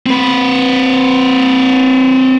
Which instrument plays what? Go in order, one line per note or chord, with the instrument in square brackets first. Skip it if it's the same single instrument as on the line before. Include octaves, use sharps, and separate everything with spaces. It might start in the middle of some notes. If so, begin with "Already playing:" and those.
[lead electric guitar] C4 B4